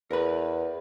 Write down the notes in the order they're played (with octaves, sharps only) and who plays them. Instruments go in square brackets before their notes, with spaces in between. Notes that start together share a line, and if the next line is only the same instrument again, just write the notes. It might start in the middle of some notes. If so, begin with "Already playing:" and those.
[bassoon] E2 [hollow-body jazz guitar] A#4 B4